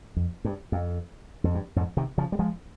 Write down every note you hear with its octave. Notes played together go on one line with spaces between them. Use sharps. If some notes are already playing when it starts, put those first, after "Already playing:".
F2
G2
F2
F2
G2
F2 G#2
C3 D#3
C#3 F3
G3
F3 G#3